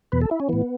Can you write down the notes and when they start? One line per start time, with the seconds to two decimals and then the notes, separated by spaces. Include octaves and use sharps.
0.12 E2 B2 B4
0.21 A4
0.31 E4
0.40 C#4
0.49 A2 E3 B3